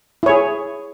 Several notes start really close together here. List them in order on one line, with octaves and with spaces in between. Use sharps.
E4 C#5 G#4